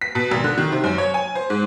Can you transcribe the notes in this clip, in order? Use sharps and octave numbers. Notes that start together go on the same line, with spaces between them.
B6
B2
G#1
D3
D#3
C3
F#2
C#5
G#5
C5
G#2